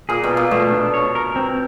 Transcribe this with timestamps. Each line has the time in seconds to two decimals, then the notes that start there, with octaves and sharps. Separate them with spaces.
0.09 A#2 G#4
0.24 B2
0.30 F4
0.37 A#2
0.51 B2 A3
0.72 D4
0.94 C#5
1.15 A#4
1.36 C4